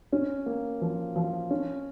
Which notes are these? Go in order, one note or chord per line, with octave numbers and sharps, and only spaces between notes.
C#4
A#3
F3
F3
C#4